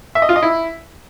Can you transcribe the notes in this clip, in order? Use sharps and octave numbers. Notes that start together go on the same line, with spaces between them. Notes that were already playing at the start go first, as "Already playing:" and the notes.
E5
D#5
F4
D#5
E4